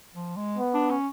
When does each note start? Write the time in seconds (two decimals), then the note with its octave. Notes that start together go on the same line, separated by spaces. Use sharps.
0.14 F3
0.36 G#3
0.57 B3
0.74 D4
0.91 C#4